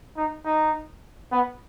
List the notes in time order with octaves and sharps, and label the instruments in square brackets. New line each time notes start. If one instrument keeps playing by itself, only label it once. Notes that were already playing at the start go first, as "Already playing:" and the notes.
[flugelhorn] D#4
D#4
B3